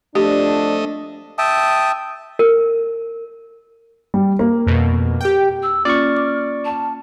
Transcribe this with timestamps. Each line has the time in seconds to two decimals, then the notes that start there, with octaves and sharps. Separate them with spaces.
0.15 F2 F3 A3 D4 G4 D#5
1.38 E5 G5 A5 D#6
2.39 A#4
4.14 G3
4.39 A#3
4.67 F2 B2
5.21 G4 G5
5.62 E6
5.85 A#3 C#4 F4 D5 C#6 F6
6.17 D6
6.64 A5